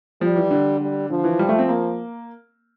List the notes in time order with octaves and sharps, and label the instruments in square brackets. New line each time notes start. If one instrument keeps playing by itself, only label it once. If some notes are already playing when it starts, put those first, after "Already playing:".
[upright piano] F3 [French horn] G3
[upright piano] E3
D3
[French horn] G3
[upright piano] D3 [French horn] F3
[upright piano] E3
G3
A3
C4
A#3